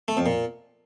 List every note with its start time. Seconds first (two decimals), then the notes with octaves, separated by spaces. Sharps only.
0.08 A3
0.17 F2
0.26 A#2